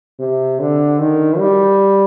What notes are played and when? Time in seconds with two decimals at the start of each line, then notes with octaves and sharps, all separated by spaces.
0.19 C3
0.60 D3
0.99 D#3
1.38 G3